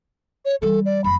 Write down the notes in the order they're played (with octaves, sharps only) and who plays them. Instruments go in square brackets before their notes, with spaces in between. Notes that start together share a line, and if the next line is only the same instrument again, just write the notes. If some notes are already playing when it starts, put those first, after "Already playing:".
[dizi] C#5
[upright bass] E3 G3 [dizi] A4
[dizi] D5
[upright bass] F#1 [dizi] B5